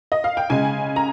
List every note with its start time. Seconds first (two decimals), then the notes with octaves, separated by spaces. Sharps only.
0.12 D#5
0.24 F5
0.37 G5
0.50 C#3 G#3 G#5
0.96 A#5